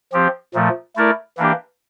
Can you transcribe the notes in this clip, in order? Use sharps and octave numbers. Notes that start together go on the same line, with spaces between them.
F3 C4 G4
A#2 F3 A3
A3 E4 A#4 D5
E3 A#3 D4 G4